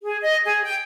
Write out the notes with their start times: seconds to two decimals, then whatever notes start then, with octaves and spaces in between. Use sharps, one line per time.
0.04 G#4
0.23 D#5
0.46 G#4
0.63 G5